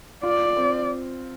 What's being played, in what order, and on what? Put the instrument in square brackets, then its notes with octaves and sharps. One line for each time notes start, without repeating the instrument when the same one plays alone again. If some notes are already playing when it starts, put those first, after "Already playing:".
[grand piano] F4 [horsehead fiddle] D5
[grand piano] C4